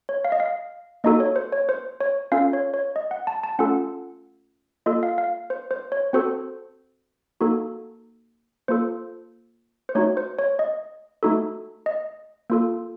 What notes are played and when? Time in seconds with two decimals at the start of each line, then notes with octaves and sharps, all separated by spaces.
0.09 C#5
0.25 F5
0.32 D#5
0.40 F5
1.04 A#3 D#4 F#4 A4 D#5
1.20 C#5
1.36 C5
1.52 C#5
1.69 C5
2.01 C#5
2.32 C#4 F4 A4 F5
2.53 C#5
2.74 C#5
2.96 D#5
3.11 F#5
3.27 A5
3.44 A5
3.59 A3 C#4 F4 A4 F#5
4.86 A#3 F4 A4 D#5
5.03 F5
5.18 F5
5.50 C5
5.71 C5
5.92 C#5
6.13 C4 F#4 A4 C5
7.41 A#3 D#4 F#4 A4
8.68 A#3 F4 A4 C5
9.89 C5
9.95 A3 D#4 F#4 C#5
10.17 C5
10.39 C#5
10.59 D#5
11.23 A3 D#4 F#4 A4
11.86 D#5
12.50 A#3 F4 A4